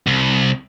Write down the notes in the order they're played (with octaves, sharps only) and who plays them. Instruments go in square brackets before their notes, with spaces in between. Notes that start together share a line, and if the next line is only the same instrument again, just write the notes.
[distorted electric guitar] C2